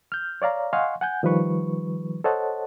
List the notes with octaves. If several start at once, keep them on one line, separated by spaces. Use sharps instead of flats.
F6 G6
C#5 D5 F5 A#5
D#5 F5 F#5 G#5 C6 C#6
F#5 G#5 G6
D#3 F3 G3 B4 C#6
A4 C5 C#5 D#5 F#5 A5